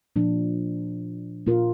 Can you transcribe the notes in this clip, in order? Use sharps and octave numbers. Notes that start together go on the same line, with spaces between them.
A#2 F3 D4
A#2 A#3 F4 A#4